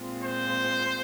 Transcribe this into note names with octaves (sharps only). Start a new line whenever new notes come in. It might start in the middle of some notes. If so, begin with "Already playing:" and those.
Already playing: A#2 G#3 C4 F4
C5